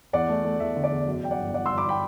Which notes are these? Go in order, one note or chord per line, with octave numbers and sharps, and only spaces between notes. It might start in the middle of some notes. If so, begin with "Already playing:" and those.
E2 D5 F#5
A3
A3
E2 E5
D3
D5
E2
F#2
F#2 G5
D5 F#5
G1
F#2 D5 F#5
G1 C6 E6
B5 D6
G5 B5